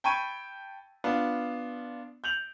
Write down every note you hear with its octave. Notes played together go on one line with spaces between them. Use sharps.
G5 A5 B5 C#6 G#6 D#7
B3 D4 F4
G6 F7 F#7